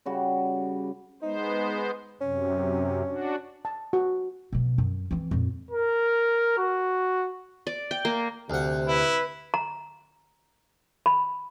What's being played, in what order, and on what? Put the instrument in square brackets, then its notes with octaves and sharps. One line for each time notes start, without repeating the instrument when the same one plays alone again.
[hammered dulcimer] C#3 G3 F#4
[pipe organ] G#3 B3 C5 [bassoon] D#4
[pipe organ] F#2 C3 [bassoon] C#4
[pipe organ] D4 F#4
[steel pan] A5
F#4
[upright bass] B2 F#3
F#2
E3 C4
F2 A#2
[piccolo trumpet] A#4
F#4
[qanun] D5
G5
A#3
[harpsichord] D2 F#5 [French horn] C3
[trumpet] E4 [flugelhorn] B4
[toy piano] A#5
B5